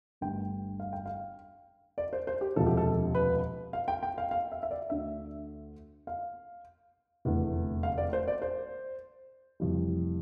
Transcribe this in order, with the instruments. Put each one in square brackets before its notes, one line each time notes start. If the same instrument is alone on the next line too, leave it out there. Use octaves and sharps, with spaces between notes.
[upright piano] G1 G2 D3 A3 G5
F5
G5
F5
D5
C5
C5
G4
E1 D2 C3 F3 A4
G4
A4
B4
F5
G5
G5
F5
F5
E5
E5
D5
D2 D3 A3 E5
F5
F1 E2 D3 A3
F5
D5
C5
D5
C5
F1 F2 E3 G3